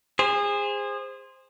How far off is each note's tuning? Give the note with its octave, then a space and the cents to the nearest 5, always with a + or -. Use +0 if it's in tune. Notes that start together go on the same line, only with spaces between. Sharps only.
G#4 -25 C5 +0